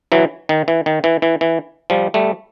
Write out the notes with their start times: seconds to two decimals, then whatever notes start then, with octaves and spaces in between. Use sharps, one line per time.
0.12 E3 F#3
0.49 D#3
0.68 E3
0.86 D#3
1.04 E3
1.22 E3
1.41 E3
1.90 F3 G3
2.14 G3 A3